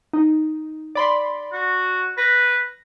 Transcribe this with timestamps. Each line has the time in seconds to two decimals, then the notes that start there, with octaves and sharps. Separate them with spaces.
0.13 D#4
0.95 D5 B5 C6
1.53 F#4
2.18 B4 A#6